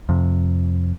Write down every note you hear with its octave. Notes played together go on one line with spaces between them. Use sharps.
F2 C3